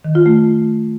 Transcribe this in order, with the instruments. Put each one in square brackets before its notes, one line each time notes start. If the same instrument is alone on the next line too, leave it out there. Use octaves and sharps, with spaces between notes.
[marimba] D#3
F4
A3